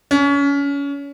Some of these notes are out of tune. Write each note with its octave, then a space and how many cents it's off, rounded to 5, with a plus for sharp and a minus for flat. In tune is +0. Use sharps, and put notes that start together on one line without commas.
C#4 +30